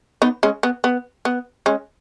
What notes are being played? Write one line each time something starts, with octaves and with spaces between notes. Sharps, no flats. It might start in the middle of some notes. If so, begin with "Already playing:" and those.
B3 D#4
G#3 C#4
B3
B3
B3
G#3 C#4